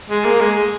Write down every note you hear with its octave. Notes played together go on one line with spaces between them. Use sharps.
G#3
A#3
G#3